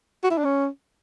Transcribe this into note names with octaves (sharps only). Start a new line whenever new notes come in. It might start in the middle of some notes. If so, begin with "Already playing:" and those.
F#4
E4
D4
C#4